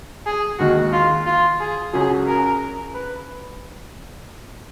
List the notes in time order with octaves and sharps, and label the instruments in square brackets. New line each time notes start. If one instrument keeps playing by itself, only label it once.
[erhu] G#4
[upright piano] D#2 D#3 G#3 D#4 [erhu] F#4
[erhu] F4
F4
G#4
[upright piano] C#2 C#3 F#3 C#4 [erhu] G#4
[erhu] A#4
B4